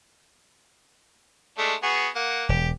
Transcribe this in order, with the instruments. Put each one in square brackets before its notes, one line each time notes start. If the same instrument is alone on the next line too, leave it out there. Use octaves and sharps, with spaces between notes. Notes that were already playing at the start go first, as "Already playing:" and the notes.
[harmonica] G#3 A3 D4
B3 F#4 G#4
A#3 F#5
[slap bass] E1 [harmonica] G4